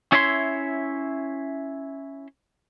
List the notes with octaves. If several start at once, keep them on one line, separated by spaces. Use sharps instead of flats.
C#4 E4 C#5 E5 G5 C6